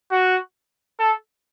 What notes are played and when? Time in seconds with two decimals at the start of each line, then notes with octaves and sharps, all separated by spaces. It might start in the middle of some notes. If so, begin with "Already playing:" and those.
0.11 F#4
0.99 A4